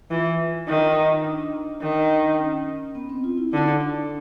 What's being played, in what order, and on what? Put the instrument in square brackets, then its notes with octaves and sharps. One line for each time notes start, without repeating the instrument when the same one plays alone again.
[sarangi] E3 [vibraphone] F4
[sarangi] D#3 [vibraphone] D#4
[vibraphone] D4
[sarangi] D#3
[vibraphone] C#4
B3
C4
F4
E4
[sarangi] D3 [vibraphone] D#4
[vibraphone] D4
D4
D4